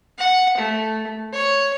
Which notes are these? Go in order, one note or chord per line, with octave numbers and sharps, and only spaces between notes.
F#5
A3
C#5